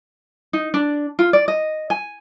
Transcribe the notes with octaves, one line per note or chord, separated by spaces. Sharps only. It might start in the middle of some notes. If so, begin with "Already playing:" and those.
D#4
D4
F4
D5
D#5
G#5